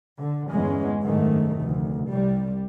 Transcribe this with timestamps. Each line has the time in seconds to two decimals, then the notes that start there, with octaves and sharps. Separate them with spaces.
0.20 D3
0.51 G1 E2 G#3 C#4
1.03 F#1 G#2 D#3 A3
1.59 F1 D2
2.08 C2 G3